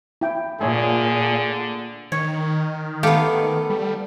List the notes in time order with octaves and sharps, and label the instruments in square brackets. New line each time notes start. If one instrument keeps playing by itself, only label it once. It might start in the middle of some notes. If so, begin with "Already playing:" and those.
[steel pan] E4 G5
[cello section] A#2 [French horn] D3 [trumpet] G#4 [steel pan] C#5 E5 G#5
[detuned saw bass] D#3 [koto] C#5
[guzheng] A3 B3 [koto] G4 F5 [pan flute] A4
[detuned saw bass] G3